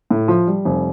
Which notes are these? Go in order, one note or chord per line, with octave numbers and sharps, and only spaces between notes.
A2
F3
G3
F1